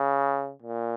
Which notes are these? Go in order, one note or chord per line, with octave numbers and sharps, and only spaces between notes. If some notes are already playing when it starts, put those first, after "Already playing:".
Already playing: C#3
A#2